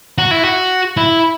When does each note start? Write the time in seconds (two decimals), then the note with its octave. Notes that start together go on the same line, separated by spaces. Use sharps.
0.18 F#4
0.31 E4
0.43 F#4
0.97 E4